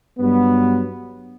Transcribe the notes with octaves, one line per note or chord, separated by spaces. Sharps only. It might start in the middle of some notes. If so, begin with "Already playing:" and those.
G2 F#3 B3